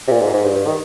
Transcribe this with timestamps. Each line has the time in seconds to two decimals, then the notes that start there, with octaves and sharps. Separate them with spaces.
0.08 C3
0.11 A#2
0.22 G#2
0.34 G#2
0.44 G2
0.56 G2
0.67 D#3